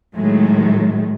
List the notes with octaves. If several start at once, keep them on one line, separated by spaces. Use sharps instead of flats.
A2 D#3 F#3 G#3 A3